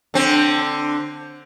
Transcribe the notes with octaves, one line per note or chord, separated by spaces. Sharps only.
D3 C4